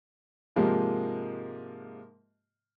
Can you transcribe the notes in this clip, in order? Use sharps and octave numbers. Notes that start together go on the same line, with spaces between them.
G#2 C3 F3 G#3 A#3 G4